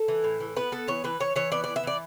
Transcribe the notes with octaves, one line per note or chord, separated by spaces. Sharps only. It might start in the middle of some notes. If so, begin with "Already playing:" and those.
Already playing: A4
E3
A2
E3
B3 B4
B3 A4
E3 C#5
E3 B4
E3 C#5
E3 C#5
B3 D5
E3 D5
E5
E3 D5